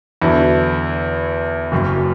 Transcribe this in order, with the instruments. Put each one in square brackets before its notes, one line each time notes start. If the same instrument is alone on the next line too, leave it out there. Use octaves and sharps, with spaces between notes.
[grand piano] E2 D3 F#3 E4
F#1 F#2 F#3